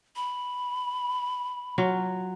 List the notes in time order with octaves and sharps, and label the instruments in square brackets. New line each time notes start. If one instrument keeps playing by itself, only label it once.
[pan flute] B5
[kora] F#3 F4